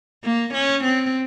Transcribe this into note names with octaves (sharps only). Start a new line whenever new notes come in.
A#3
C#4
C4